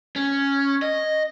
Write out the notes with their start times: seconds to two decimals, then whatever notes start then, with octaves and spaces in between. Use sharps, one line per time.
0.16 C#4
0.82 D#5